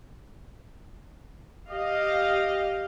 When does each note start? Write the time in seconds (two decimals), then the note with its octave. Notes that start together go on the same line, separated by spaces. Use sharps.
1.69 G4 D#5 F5